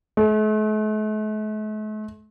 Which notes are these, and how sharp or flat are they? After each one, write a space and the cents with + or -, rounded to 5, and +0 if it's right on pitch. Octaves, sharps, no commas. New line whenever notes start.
A3 -45